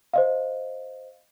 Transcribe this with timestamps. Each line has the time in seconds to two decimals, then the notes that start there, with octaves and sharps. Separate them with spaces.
0.13 C5 D#5 F5